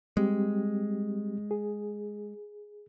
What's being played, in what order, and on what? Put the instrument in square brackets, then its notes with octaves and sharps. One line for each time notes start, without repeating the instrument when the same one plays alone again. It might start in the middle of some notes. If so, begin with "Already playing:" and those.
[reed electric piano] G3 C4 G4 [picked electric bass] G#3
[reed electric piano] G#4